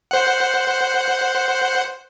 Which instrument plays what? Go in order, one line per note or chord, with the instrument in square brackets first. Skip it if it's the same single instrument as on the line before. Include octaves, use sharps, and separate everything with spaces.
[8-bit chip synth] C5 F#5